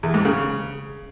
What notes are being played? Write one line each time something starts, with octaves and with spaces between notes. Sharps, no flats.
E2
G#2
C#3